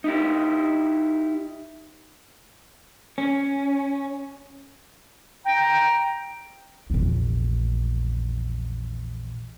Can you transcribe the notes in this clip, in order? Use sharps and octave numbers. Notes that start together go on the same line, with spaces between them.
D#4 E4 G4
C#4
G5 A#5
A#1 E2